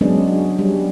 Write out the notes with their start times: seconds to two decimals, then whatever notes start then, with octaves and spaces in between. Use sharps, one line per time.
0.01 F#3 G#3 B3 C#4 D4 G#4
0.59 G3